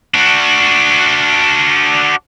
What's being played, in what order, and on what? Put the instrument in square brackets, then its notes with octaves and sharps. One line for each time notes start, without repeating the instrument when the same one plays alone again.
[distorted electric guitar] D4 F#4